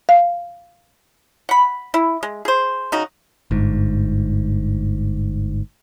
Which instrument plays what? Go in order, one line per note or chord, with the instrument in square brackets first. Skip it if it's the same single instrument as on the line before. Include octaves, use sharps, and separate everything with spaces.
[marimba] F5
[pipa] F#5 B5
E4
G#3
G#4 C5
C#3 D#4 F#4
[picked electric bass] G1 G#2